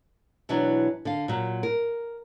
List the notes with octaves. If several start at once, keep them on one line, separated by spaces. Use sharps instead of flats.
B2 E3 F#3 D4
D3 F5
A#2 F#3
A#4